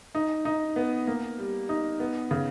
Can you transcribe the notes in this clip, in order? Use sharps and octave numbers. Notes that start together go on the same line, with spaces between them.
D#4
D#4
B3
A#3
G3
D#4
B3
C#3